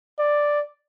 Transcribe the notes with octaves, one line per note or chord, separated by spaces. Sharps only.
D5